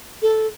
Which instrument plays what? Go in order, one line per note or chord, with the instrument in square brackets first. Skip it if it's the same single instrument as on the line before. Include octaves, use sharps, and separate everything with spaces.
[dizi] A4